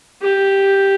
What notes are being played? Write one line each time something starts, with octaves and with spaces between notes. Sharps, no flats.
G4